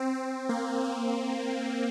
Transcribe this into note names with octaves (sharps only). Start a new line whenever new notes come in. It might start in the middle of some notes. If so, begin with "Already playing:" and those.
Already playing: C4
C4
A#3
A#3